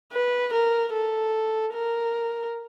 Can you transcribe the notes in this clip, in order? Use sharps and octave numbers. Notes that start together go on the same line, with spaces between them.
B4
A#4
A4
A#4